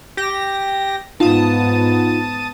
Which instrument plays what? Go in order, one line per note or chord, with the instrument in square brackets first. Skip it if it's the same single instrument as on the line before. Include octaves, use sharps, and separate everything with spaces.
[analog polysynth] G4 A#6
[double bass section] G#2 B3 [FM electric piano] D#4 F4 [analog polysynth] A5 D#6